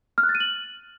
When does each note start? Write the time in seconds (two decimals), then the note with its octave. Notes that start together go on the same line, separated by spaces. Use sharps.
0.18 F6
0.23 F#6
0.29 A6
0.35 D#7
0.40 F#7